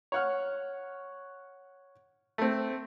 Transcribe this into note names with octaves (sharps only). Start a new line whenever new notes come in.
C#5 F#5 F6
A3 C4